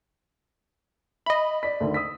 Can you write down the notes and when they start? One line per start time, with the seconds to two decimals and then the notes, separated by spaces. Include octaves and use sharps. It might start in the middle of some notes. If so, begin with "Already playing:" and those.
1.26 D#5 E5 B5
1.63 D5 B6
1.80 D2 D3 D#3
1.94 D#6 E6 B6